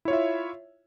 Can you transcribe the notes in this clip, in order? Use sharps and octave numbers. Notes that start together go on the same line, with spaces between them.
E4 F4 C#5 E5